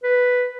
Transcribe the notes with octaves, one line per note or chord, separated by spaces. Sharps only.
B4